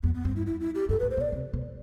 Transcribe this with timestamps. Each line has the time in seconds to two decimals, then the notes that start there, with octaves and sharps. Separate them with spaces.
0.03 F2 B3
0.14 B3
0.25 G2 C4
0.36 E4
0.46 E4
0.60 E4
0.75 G4
0.89 G2 A4
1.00 B4
1.03 A2
1.11 C5
1.17 B2
1.21 D5
1.32 C3
1.53 B2